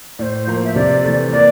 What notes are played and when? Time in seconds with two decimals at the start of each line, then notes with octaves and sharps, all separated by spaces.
0.19 A2 C5 D5
0.47 F3 A#3
0.64 E5
0.76 C3 D5
1.04 E3 A3
1.32 A#3 D5